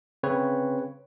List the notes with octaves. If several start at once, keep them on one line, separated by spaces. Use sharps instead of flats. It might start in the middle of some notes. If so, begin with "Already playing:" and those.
C#3 C4 B4 C#5